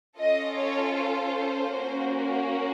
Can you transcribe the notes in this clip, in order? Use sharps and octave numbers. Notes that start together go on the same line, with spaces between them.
C#4 F4 A4 D#5
C#5
C5
A#3 C#4 F#4